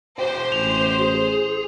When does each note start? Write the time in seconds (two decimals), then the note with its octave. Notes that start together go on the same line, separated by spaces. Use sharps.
0.19 F#4 C5 G5
0.52 A1 F7
1.02 G#4